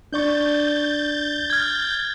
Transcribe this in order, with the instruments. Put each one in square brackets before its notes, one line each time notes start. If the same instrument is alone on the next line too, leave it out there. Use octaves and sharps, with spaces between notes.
[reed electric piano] D4 D5 C#6 [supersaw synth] G6 A6
[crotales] F6 G#6